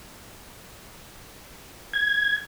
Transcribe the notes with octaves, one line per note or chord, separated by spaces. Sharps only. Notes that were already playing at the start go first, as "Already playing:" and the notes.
G#6